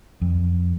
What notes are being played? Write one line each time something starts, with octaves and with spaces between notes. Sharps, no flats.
F2